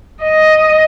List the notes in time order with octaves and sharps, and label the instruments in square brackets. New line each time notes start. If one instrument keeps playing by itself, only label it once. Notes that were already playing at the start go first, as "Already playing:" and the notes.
[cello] D#5